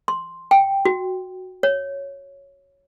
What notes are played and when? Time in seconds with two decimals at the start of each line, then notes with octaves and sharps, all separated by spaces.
0.08 C6
0.51 G5
0.85 F#4
1.63 C#5